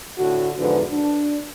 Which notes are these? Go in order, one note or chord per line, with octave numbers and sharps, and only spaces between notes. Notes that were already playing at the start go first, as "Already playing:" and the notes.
A2 D3 F#4
E2 G#2 D3 F3 B4
D4